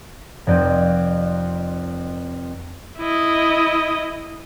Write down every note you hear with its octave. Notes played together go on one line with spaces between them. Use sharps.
F1 F2 D5 G6 D#7
E4 D#5